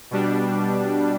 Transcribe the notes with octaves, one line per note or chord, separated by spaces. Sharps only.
B2 G3 D4